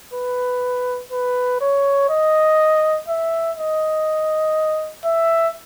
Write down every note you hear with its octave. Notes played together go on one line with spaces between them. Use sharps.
B4
B4
C#5
D#5
E5
D#5
E5